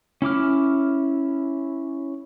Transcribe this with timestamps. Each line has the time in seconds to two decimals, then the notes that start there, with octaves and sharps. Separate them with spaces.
0.22 C#4 E4 D6 F6